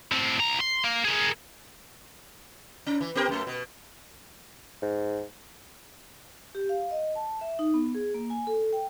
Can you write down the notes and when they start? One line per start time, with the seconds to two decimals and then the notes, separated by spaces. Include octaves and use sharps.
0.12 A2 C4
0.39 C2 A#5
0.60 C6
0.84 A#3
1.05 G#4 A#4
2.86 C#4
3.01 E3
3.15 B3 G4 A#4
3.29 F#2 A3
3.47 B2
4.82 G#2
6.55 G4
6.69 F5
6.91 D#5
7.16 A5
7.41 E5
7.59 D#4
7.74 B3
7.95 G#4
8.14 A#3
8.30 G#5
8.47 A4
8.73 G5